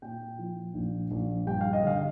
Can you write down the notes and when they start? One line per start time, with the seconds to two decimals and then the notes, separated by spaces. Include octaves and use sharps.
0.02 A#2 G5
0.39 F3
0.74 A#1
1.11 A#1
1.47 G2 G5
1.61 F5
1.73 D#5
1.83 D3 F5